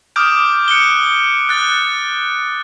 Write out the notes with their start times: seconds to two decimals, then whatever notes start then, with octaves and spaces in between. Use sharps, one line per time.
0.16 D6 D#6 F6 G6 D7
0.68 F#6 C#7 D7 G7
1.49 F#6 A6